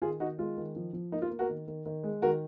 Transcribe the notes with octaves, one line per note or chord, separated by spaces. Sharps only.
D#3 F4 G#4
D#3 D#4 F#4
G#3 F4
D#3
F3
F3
A#3 D#4
F4
A#3
F#4 A#4
D#3
D#3
D#3
G#3
D#3 F#4 A#4